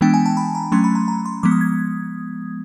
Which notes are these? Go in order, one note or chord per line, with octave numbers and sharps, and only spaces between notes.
E3 G#3 B3 D4 G5
G#5
A5
B5
A#5
F#3 A3 C#4 C6
B5
A#5
A#5
C6
F3 G#3 B3 D6
D#6
G#6